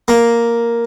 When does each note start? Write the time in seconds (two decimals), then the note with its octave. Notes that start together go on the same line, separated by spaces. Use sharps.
0.08 A#3